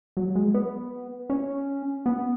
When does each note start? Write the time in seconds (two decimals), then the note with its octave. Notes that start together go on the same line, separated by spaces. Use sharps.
0.17 F#3
0.35 G#3
0.54 B3
1.30 C#4
2.06 B3